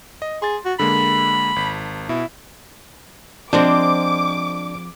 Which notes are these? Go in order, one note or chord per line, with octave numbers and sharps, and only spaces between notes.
D#5
G#4 C6 A6
F#4
D3 G#3 A#3 B5
G#1 B6
B2 E4
F3 G#3 C4 D4 D6